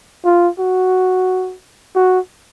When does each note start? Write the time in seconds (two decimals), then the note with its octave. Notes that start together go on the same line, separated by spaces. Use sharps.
0.25 F4
0.59 F#4
1.95 F#4